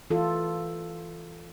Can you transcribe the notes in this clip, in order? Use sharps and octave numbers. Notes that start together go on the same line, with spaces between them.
E3 F4 A4